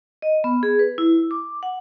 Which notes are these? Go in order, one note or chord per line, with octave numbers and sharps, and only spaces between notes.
D#5
B3
G#4
B4
E4
D6
F#5